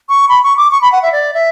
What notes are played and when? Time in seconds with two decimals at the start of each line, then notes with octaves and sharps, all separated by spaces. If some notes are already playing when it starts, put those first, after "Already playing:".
0.09 C#6
0.29 B5
0.43 C#6
0.57 D6
0.71 C#6
0.82 B5
0.92 F#5
1.03 E5
1.12 D5
1.34 E5